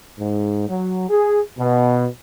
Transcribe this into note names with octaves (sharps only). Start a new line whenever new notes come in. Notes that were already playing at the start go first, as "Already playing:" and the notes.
G#2
F#3
G#4
B2